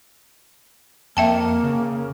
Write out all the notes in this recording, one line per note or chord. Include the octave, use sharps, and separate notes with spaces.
F2 A#3 E5 G5 A5
C#3